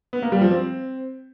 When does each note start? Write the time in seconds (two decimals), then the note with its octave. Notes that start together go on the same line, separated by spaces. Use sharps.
0.13 B3
0.22 A#3
0.32 G3
0.42 F3
0.51 C4